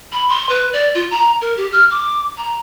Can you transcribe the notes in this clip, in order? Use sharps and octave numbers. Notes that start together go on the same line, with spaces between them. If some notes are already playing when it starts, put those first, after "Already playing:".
B5
C6
B4
D5
F4
A#5
A#4
G4
F6
D6
A#5